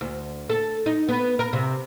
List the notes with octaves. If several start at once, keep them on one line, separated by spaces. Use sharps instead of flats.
D2
A4
D#4
B3
A#4
C3